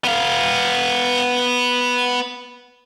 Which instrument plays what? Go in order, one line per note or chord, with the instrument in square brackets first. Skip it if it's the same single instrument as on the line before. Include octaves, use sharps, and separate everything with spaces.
[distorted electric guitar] B3 F5